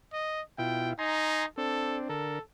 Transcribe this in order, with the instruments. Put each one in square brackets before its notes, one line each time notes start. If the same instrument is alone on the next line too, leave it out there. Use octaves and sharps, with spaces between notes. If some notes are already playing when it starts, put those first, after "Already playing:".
[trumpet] D#5
[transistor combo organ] B2 E4 F4 [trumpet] G5
[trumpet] D#4 [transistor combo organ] G#5 A#5 C6
[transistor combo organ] C4 D4 [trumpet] A4
[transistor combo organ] D3 A#4 [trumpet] A4